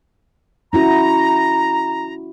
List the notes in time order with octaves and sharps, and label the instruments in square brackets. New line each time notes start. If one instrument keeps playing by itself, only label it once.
[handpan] C#4 E4 F#4 [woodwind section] A#5